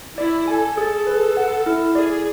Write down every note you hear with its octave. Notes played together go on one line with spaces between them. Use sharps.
E4 D5
A4 G#5
G#4 A4
B4
F#5
E4
G#4 D5